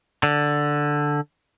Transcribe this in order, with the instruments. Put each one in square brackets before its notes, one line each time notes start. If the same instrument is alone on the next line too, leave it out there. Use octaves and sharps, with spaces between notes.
[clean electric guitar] D3